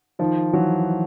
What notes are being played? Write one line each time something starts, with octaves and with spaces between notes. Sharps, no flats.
D#3 F3
E3 F#3